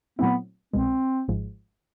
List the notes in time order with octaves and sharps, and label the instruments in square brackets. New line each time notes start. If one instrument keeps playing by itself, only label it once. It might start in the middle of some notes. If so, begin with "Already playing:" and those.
[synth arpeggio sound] A#2 F#3 A3 C4 E4 [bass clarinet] B3
[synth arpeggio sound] C2 B2 G#3 [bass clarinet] C4
[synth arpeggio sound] G#1 G#2 F3 G#3